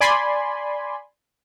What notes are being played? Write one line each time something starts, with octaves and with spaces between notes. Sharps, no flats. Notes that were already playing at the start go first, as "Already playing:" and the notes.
D5 G#5 B5 C6